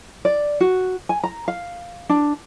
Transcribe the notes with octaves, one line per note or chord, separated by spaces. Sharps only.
D5
F#4
G#5
A#5
F5
D4